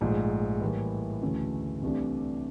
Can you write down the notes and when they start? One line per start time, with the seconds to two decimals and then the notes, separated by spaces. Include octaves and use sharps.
0.01 A#1 G#2 F3 A3
0.61 A2 E3 G3 A#3
1.22 D2 C#3 E3 A3 C#4
1.82 C2 C3 E3 A3 D4